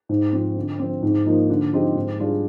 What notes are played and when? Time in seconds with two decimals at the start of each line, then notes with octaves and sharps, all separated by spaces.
0.09 G#2
0.32 F3 C4
0.56 D3
0.79 F3 C4
1.03 G#2
1.26 F3 A#3 D#4
1.50 D3
1.72 F3 C4 D#4 G4
1.96 G#2
2.20 G3 D4 F4 G#4